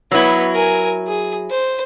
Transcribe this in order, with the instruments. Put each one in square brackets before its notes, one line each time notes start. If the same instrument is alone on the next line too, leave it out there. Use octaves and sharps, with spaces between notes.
[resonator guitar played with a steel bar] F#3 E4 [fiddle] B3
[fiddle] A#4 G#5
G#4
C5